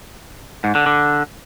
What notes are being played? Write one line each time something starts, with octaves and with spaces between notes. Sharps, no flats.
G#2
D3
D3